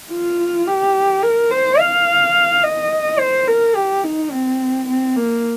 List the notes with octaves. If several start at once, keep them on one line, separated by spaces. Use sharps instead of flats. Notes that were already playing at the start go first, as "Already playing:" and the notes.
F4
G4
A#4
C5
F5
D#5
C5
A#4
G4
D#4
C4
C4
A#3